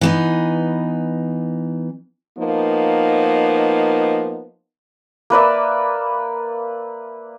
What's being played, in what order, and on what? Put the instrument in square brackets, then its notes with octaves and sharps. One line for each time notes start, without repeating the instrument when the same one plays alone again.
[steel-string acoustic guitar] E3 B3 D#4
[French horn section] F3 A#3 B3 D#4
[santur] A#3 B4 D5 E5